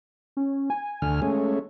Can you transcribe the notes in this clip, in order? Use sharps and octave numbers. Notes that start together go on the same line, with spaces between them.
C#4
G#5
D2 D3 F6
G#3 A3 C#4